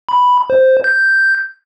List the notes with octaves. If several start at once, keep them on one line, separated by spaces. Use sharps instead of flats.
B5
C5
G6